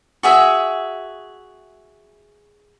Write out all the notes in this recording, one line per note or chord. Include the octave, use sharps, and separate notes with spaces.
F#4 G#4 E5